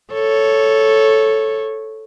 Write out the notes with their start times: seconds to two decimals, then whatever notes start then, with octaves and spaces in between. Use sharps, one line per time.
0.12 A4 C#5